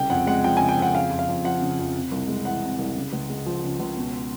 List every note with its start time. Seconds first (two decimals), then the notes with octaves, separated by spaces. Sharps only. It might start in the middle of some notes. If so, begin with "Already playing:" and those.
Already playing: C2 C#3 G5
0.10 F2 F#5
0.27 G#3 F#5
0.44 F3 G5
0.57 C#3 G#5
0.69 G5
0.77 F2 F#5
0.94 C#3 F5
1.11 F2
1.19 F5
1.28 F2
1.44 F3 F#5
1.62 C#3
1.79 F2
1.95 C3
2.12 C2
2.28 G#3
2.45 E3 F#5
2.63 C3
2.78 C2
2.96 C#3
3.13 C#2
3.30 G#3
3.46 F3
3.64 C#3
3.80 C#2
3.97 B2